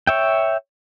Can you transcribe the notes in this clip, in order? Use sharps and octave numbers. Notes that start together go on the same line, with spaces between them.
C#5 E5 G5